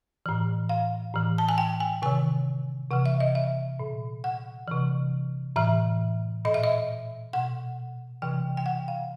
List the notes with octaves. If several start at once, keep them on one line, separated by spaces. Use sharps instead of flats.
A2 E3
F5
A2 E3
A5
G#5
G5
G#5
C3 D#3 G#5
C3 E3 F#5
E5
D#5
E5
A#2
F#5
C3 E3
A2 E3 E5
A#2 D#5
E5
D#5
B2 F#5
C3 E3 G5
G5
F#5
F5